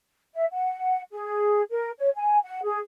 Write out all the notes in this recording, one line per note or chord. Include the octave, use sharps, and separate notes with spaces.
E5
F#5
G#4
A#4
C#5
G#5
F#5
G#4